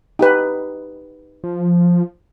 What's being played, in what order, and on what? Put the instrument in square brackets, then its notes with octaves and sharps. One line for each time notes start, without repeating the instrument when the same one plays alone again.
[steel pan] D#4 G4 B4
[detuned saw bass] F3